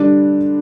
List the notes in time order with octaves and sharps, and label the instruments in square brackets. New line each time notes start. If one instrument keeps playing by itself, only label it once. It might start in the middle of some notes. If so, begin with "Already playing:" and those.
Already playing: [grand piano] D3 G3 D4